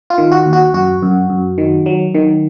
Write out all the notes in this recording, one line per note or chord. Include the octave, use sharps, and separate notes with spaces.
F4
D#3
F#4
D#2
F#4
F#2 F#4
F#2
F#2
D#3
F#3
D#3